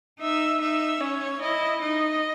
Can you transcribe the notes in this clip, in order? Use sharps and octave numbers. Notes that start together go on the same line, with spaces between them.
D#4 E5
D#4 E5
C#4 C#5
E4 D#5
D#4 D#5